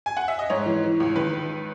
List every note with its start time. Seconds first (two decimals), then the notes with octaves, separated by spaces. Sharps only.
0.06 G#5
0.17 F#5
0.28 E5
0.39 D#5
0.50 G#2 C#5
0.66 E3
0.84 E3
1.00 C#2
1.16 D#3 B4